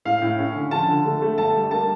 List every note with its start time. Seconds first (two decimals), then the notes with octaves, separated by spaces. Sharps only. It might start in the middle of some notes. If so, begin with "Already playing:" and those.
0.05 A2 F5
0.22 A2
0.39 C#4
0.55 D3
0.71 F3 A5
0.88 D3
1.05 A3
1.22 A3
1.38 G1 A5
1.55 G3
1.71 A#3 A5